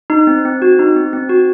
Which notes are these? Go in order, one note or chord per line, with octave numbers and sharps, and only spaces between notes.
D#4
C4
C4
F#4
D#4
C4
C4
F#4